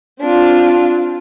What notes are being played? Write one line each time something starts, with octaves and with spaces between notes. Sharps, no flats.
C4 D4 F4